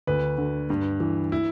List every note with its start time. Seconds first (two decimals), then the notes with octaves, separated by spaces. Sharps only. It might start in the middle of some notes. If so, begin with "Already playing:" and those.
0.07 D2 B4
0.38 D3
0.70 G2
1.00 E3
1.32 E4